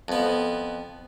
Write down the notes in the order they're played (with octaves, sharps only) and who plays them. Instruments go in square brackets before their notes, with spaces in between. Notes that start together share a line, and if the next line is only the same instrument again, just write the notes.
[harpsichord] F2 B3